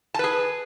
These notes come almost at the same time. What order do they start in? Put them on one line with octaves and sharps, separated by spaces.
A5 B4 G#4